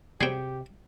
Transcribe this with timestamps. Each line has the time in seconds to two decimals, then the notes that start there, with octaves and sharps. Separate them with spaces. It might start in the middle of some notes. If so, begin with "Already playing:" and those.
0.21 C3 F#3 G3 C4 G4 G#4 G5